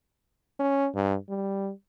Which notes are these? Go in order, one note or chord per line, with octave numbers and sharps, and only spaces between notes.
C#4
G2
G3